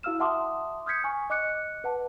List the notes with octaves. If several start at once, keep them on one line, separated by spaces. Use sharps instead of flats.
E4 F#4 F5 E6 F6 E7
E5 F#5 A5 C6 D6 D#6
D#6 F6 G6 G#6 B6 C#7
G#5 C#6
D#5 D6 F#6 C#7
B4 F#5 A5